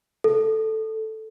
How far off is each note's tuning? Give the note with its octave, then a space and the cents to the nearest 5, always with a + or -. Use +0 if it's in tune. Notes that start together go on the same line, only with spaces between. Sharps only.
A4 +0